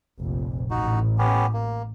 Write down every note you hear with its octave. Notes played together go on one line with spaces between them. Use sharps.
F1 A#1
A1 D#4 F#4
B3 C#4 G4
A#3